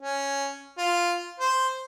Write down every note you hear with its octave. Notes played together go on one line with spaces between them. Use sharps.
C#4
F4
C5